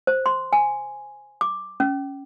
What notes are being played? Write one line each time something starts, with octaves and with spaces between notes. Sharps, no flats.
C5
C6
G#5
D6
C#4